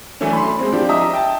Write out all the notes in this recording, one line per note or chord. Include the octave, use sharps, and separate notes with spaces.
E3 F#3 A3 C#4 D4
B5 C6
G#3 C4
F3 D4 G4
D#5 E5 A#5 D#6
G5 A5